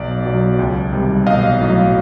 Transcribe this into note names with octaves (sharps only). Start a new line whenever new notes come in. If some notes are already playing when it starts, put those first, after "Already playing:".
Already playing: B1 D5
B2 F#3
C#2
C3 D#3 G3
B1 D#5 F5
A2 F#3